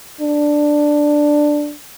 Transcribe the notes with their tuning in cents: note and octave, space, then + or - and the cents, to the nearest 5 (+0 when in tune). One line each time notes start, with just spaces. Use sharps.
D4 +5